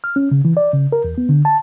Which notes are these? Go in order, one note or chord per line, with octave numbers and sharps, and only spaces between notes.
F6
C#4
C#3
E3
D5
C#3
A#4
E2
B3
D3
A5